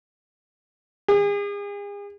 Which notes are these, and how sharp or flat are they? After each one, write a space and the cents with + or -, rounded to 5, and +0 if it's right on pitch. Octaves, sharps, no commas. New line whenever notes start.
G#4 -40